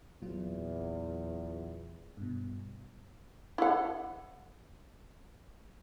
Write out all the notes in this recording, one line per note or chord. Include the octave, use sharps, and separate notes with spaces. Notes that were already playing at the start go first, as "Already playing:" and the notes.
E2 A#2 F#3 F4
G2 B2
E4 F#5